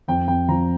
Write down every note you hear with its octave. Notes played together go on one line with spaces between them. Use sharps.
F2 G5
F2 G5
F3 A#5